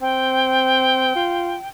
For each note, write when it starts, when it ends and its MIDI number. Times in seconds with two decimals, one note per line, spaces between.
0.01 1.11 60
0.01 1.68 79
1.15 1.55 65